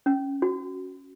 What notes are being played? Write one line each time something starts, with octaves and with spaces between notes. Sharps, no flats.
C#4
F#4